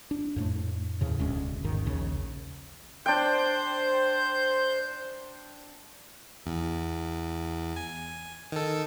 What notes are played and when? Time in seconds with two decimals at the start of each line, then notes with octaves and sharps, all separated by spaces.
0.11 D4
0.36 F2 A2 A3
1.01 D#2 A2 C#3
1.19 E1 D2 G#3 C#4
1.63 G#1 D#2 G#2 D#3
1.85 A#1 D#2 C#3
3.06 D4 C5 G5 G6
6.46 E2
7.76 G#5
8.52 D#3 A4